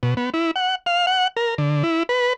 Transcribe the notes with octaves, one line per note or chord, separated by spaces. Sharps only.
B2
B3
E4
F#5
F5
F#5
A#4
D3
E4
B4